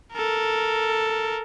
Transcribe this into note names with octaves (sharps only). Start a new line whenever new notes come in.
A4 A#4